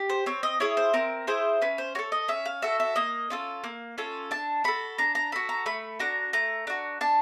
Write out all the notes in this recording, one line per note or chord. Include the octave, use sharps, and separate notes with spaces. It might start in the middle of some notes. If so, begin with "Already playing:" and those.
Already playing: G4
C5
C4 C#5
D#5
E4 G#4 C#5
C5
C4 A#4
E4 G#4 C5
C#4 B4
C5
F#4 A4 C#5
D#5
C#4 E5
F5
F#4 A4 E5
E5
A#3 D#5
C#4 F4 A4
A#3
C#4 F4 A4
D4 A5
F#4 A4 B5
D4 A#5
A#5
F#4 A4 B5
A#5
A3 B5
D4 F#4 A#5
A3 A#5
D4 F#4
D4 A5